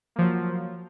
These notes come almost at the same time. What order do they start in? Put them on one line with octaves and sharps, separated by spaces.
A#3 F3 F#3